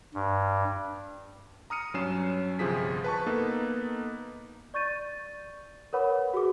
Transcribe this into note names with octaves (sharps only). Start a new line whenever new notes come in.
G2
A#5 D#6 F6 C#7 D#7
G2 F#3 C#4 C7 E7
G1 C3 F3 F4 G#4 B6
B4 A5 C#6
A#3 B3 D#4 A4 B4
D5 C#6 G6 A6 D#7
A#4 B4 C#5 F#5 B5 D6
F#4 G#4 D6